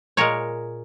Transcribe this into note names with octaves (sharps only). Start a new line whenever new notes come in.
A#2 G#3 A#4 C#5